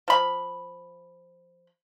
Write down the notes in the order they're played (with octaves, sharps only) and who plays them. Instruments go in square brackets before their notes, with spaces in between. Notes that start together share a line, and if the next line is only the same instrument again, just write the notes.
[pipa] F3 B5